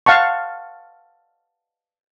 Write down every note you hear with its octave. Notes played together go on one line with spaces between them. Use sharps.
F5 F#5 A5 C#6